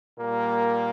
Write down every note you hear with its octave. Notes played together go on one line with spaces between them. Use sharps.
A#2 G3 A#3